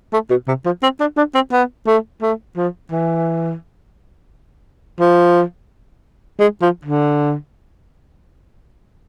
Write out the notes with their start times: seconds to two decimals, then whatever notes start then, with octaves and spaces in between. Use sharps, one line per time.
0.13 A3
0.30 B2
0.48 C3
0.65 F3
0.83 C4
1.00 D4
1.17 D4
1.35 C4
1.52 B3
1.87 A3
2.22 A3
2.56 F3
2.91 E3
5.00 F3
6.40 G#3
6.62 F3
6.85 D3